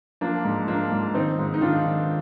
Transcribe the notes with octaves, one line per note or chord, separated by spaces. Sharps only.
F3 A#3 D4
G#2
F3 A#3 D4
G#2
D#3 C4 D#4
G#2
D#4
D#3 D4 F4
D#3